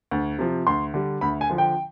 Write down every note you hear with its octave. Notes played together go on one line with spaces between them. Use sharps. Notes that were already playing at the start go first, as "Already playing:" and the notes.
D2
C3 F3
D2 C6
D3 G3
D2 B5
G#5
D3 F3
G5